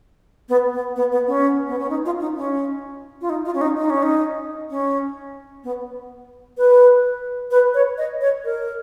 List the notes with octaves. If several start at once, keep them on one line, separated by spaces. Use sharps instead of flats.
B3
B3
B3
B3
C#4
B3
C#4
D#4
F4
D#4
C#4
F4
D#4
F4
C#4
D#4
D#4
C#4
D#4
C#4
B3
B4
B4
C#5
D#5
C#5
A#4